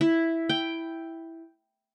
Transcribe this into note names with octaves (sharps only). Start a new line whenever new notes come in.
E4
G5